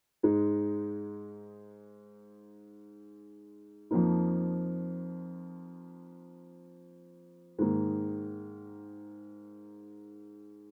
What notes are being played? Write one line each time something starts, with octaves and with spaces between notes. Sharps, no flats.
G#2 G#3 D#4
F2 F3 A#3 D#4
G#2 D#3 A#3 D#4